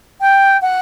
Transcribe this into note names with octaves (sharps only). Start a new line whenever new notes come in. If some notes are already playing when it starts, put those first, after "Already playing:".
G5
F#5